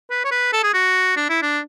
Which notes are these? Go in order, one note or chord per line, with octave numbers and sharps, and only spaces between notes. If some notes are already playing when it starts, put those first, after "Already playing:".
B4
C#5
B4
A4
G#4
F#4
D4
E4
D4